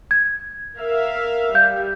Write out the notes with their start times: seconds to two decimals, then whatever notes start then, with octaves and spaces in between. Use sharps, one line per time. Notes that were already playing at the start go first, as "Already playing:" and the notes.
0.11 G#6
0.78 A#4 E5 F5
1.55 G3 F5 G6